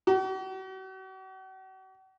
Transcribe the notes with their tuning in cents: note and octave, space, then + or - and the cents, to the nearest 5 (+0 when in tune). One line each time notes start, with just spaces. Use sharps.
F#4 +40